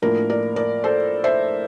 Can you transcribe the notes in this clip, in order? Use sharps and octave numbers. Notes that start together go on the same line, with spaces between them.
A2 F3 A#3 D4 A#4
A#4 D5
A#4 D5
A4 C5
C5 E5